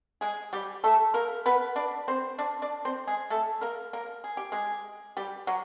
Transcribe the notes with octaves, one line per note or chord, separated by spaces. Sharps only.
G#3 G#4
G3 G4
A3 A4
A#3 A#4
B3 B4
D4 D5
C4 C5
D4 D5
D4 D5
C4 C5
G#3 G#4
A3 A4
A#3 A#4
A#3 A#4
G#4
G4
G#3 G#4
G3 G4
F#3 F#4